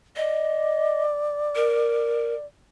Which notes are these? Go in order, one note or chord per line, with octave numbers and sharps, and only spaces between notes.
D5 D#5
A#4